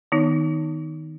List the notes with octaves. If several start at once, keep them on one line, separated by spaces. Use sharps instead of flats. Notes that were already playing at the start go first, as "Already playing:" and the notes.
D#3 B3 D#4